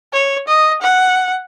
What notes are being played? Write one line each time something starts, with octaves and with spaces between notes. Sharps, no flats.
C#5
D#5
F#5